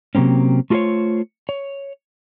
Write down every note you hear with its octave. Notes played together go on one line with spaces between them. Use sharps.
C3 F#3 A#3 C4 C#4
A3 F4 F#4 A4 C5 C#5
C#5